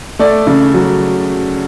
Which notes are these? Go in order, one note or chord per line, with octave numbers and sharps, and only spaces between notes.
A3 D5
C#3
F#3